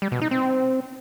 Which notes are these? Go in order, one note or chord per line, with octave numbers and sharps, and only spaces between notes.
G3
B2
D#4
C4